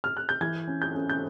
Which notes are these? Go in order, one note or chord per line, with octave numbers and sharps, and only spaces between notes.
F6
F#6
G6
E3 G#6
C#4
G6
C#4
G6